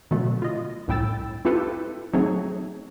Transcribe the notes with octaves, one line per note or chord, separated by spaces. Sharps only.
B2 D3 F#3 A3
F4 D#5
C2 A2 E4 G5 E6 A6
C4 E4 F4 G4 A4 B4
F#3 A3 C4 D#4 G#4 C#5